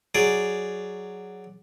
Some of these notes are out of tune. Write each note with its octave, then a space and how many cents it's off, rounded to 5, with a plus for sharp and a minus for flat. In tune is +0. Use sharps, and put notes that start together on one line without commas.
F#3 +0 G#4 +0 D5 +0